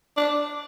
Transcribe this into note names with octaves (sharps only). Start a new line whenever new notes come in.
D4